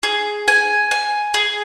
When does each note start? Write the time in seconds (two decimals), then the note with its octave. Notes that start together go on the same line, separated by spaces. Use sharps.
0.03 G#4
0.48 G#5
0.91 G#5
1.34 G#4